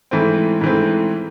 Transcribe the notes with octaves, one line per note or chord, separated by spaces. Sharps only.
G#2 E3 A3 C4
G#2 E3 A3 C4